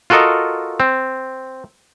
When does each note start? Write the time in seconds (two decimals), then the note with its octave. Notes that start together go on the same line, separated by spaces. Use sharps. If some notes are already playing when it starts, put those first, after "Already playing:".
0.10 F4 F#4 A4 A#4 D#5
0.80 C4